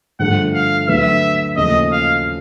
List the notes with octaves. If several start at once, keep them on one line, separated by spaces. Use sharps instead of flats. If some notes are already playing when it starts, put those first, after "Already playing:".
G2 D3 F3 A3 F#5
F5
D2 D3 F#3 B3 E5
D#2 C#3 F3 A3 D#5
F5